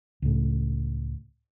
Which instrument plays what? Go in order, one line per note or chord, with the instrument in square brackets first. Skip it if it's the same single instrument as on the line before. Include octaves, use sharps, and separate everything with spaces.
[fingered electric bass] C#2 A2